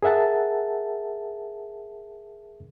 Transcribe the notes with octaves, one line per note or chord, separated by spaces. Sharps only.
G#4 A#4 E5 F#5 A5